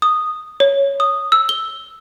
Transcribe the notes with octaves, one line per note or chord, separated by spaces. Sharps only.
D#6
C#5
D#6
E6
G7